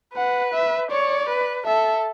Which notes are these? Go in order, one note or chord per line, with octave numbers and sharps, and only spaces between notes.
B4 F#5
E5
C#5 D5
B4
A4 E5